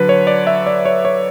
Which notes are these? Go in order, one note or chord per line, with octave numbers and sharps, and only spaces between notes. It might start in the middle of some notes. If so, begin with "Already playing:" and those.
Already playing: D3 F#3 B4
C#5
D5
E5
D5
C#5
C#5